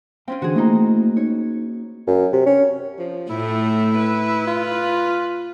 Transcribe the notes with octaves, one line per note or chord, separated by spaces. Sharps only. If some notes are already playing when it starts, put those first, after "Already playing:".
C4 C#4 F4 F5 G5
D3 E3 F#4 G#4
A3 A#3 D#4 E4 A#5
D#4 C#5
F#2
C3
C#4
F3
A2 A3 E4
B4
F4